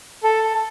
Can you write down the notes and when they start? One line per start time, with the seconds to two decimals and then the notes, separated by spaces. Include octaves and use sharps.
0.23 A4